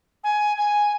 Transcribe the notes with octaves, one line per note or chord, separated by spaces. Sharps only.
G#5
G#5